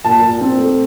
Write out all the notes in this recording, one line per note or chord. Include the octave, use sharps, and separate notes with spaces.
A#2 A5
A#2
C4
A3